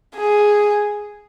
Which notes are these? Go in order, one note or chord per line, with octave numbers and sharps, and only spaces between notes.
G#4